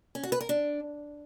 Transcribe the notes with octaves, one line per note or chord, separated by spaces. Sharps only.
C#4
F#4
B4
A#4
D4